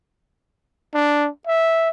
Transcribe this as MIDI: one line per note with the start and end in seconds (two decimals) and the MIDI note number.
0.94 1.29 62
1.47 1.90 76